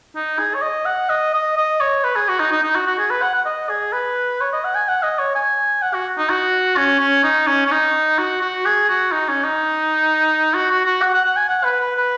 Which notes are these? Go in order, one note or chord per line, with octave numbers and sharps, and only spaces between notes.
D#4
G#4
C#5
D#5
F#5
D#5
D#5
D#5
C#5
B4
G#4
F#4
D#4
D#4
D#4
F#4
F#4
G#4
B4
F#5
F#5
D#5
G#4
B4
C#5
D#5
F#5
G#5
F#5
D#5
C#5
G#5
F#5
F#4
D#4
F#4
C#4
C#4
D#4
C#4
C#4
D#4
F#4
F#4
G#4
F#4
D#4
C#4
D#4
F#4
F#4
F#4
F#5
F#5
F#5
G#5
F#5
B4
B4
B4